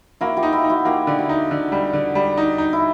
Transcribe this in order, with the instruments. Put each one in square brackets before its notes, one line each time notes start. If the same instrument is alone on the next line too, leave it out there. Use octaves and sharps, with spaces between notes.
[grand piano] A#3 [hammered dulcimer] E4 F#4
[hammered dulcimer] F4 G4
[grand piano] D#4
[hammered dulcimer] E4 F#4
[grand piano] D#4
[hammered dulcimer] E4 F#4
[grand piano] A#3 [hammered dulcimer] F4 G4
[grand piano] D3
[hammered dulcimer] E4 F#4
[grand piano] D#4
D3
G3
D3
G3
D#4
D#4
[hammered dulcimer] E4